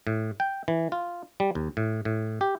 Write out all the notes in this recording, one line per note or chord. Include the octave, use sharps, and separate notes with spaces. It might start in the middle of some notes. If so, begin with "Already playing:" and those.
A2
G5
E3
F4
G3
D#2
A2
A2
G4